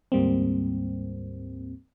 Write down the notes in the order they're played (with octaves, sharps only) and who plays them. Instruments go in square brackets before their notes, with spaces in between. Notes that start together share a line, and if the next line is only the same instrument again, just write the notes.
[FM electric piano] D2 G#2 G3 A#3 C4